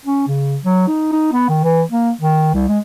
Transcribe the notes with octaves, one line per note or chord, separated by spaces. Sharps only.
C#4
C#3
F#3
D#4
D#4
B3
D#3
E3
A#3
D#3
C2
G#3